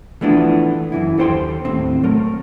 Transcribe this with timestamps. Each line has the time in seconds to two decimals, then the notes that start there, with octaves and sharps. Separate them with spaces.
0.21 E3 F3 A3 B3 D4 E4
0.92 F#2 E3 E4
1.18 D#2 A4 C5 G5 C6
1.65 D#2 A2 C4
2.03 F#3 A3 A#4